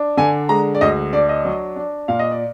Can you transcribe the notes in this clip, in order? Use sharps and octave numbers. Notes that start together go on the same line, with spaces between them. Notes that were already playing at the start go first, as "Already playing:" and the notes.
Already playing: D4
D3 G#5
G#3 A#5
D5
D2 D#5
D4 D5
D#5
F#3
D4
A#2 F5
D#5
D5